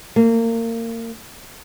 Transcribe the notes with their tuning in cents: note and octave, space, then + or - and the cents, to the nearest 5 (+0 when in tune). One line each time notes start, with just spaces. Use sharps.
A#3 -30